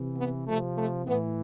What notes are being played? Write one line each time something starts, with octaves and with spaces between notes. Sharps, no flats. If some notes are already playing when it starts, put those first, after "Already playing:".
Already playing: C3 E3
B3
C3 F3 A3
A3
A2 E3 B3